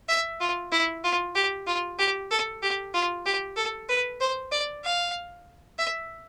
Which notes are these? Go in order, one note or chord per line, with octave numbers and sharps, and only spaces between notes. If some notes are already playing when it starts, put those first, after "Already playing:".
E5
F4
E4
F4
G4
F4
G4
A4
G4
F4
G4
A4
B4
C5
D5
F5
E5